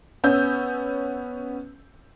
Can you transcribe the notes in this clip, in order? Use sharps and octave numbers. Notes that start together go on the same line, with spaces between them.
B3 C#4 E6 G6